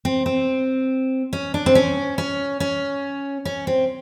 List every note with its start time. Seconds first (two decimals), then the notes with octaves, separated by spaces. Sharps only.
0.05 C4
0.26 C4
1.33 C#4
1.54 D4
1.66 C4
1.75 C#4
2.18 C#4
2.60 C#4
3.45 C#4
3.67 C4